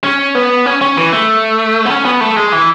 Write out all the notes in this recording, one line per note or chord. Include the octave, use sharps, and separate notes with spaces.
C#4
B3
C#4
C#4
E3
A3
B3
C#4
B3
A3
G#3
E3